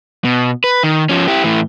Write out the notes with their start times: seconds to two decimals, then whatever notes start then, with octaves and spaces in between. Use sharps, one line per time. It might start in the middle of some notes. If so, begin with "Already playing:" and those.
0.25 B2
0.64 B4
0.83 D#3
1.09 F3 C#4
1.28 E4 G4
1.44 A2 E3